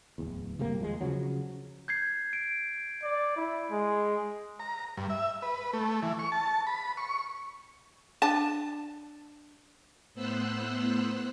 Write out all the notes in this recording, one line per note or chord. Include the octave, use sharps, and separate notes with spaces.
D1 E2
F#1 C3 G3 A#3
D#2 F3 G#3
C#3 F3 F#3
G6 G#6 C7
D7
D5
E4
G#3
A#5
G2
E5
B4
A3
E3
C#6
A5
B5
C#6
D4 A5
A2 B3 C5 E6 F#6